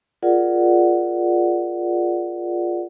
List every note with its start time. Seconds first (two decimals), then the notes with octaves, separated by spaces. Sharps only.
0.23 F4 G#4 A#4 D5 F#5